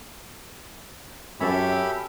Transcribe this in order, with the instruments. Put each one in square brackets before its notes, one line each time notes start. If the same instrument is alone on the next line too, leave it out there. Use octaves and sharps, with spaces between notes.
[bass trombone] F#2 [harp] C#4 A4 [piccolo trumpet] G4 [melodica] E5 B5